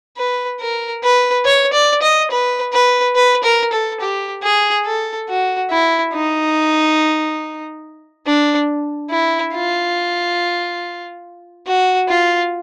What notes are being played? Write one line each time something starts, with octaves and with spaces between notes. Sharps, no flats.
B4
A#4
B4
C#5
D5
D#5
B4
B4
B4
A#4
A4
G4
G#4
A4
F#4
E4
D#4
D4
E4
F4
F#4
F4